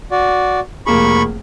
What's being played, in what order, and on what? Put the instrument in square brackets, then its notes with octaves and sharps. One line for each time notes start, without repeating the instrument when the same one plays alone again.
[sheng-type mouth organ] F#4 D5
[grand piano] F1 A#3 G#4 [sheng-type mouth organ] B5 C#6